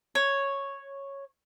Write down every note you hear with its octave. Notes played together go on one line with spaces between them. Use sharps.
C#5